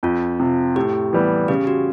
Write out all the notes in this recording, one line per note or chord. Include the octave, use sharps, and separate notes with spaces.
F2 F4
C3 F3
A2 G4
E3 G3 B3
C#3 G4
F#4